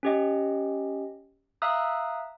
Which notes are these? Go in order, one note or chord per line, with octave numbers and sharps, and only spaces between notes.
C#4 G4 D#5
E5 F5 A#5 D#6 E6 F#6